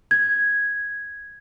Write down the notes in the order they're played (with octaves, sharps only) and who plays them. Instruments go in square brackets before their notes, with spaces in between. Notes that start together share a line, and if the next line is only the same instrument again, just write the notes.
[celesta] G#6